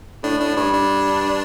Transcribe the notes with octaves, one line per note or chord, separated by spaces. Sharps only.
A2 D4
A2 D4
G2 D4
D4